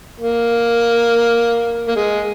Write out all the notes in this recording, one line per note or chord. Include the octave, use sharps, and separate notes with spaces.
A#3
A#3
G#3